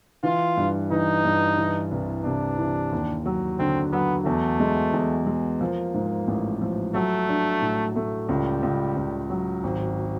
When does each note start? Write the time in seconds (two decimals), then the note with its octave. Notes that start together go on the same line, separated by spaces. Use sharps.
0.23 E3 F4
0.57 G2
0.91 E3 D#4
1.25 G2
1.58 E3
1.91 C2
2.24 C3 D4
2.59 E3
2.92 D#2
3.26 F#3
3.59 D3 C4
3.93 F#3 B3
4.26 E2 A3
4.60 G#3
4.93 E2
5.27 G#3
5.61 F3 A#3
5.94 G#2
6.27 A1
6.62 F3
6.95 F#3 A3
7.29 D4
7.62 A2
7.96 A3
8.29 C#2 G3
8.63 C#2
8.96 C#2
9.30 F#3
9.64 G#1